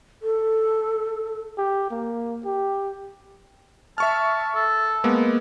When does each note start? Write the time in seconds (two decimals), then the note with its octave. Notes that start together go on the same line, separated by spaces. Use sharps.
0.22 A4
1.58 G4
1.91 A#3
2.45 G4
3.98 E5 A5 C#6 F6
4.55 A4
5.04 G#3 A#3 B3